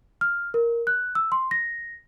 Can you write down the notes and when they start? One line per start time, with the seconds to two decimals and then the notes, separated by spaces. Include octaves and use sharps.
0.21 F6
0.54 A#4
0.87 F#6
1.15 E6
1.32 C6
1.51 A#6